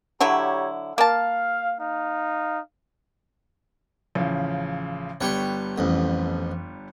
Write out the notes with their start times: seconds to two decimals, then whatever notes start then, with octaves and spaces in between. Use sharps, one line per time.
0.21 D3 F#3 E4 G4 C#5 A#5
0.98 A#3 F5 A5
1.80 D#4 F5
4.15 A1 C#3 F3
5.21 G1 G3 B3 C#5 G5 C#6
5.78 A1 F2